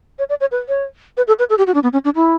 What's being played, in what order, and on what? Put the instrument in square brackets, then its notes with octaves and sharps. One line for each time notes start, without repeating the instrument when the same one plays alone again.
[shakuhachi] C#5
D5
C#5
B4
C#5
B4
A4
B4
A4
G4
F#4
D4
B3
C#4
D4
E4